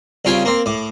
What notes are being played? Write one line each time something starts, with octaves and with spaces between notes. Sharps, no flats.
C2 C#3 F4 G5 G#5
A#3 C4
A2 D6